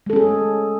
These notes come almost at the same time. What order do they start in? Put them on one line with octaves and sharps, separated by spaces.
G#3 A4 C#4 G#4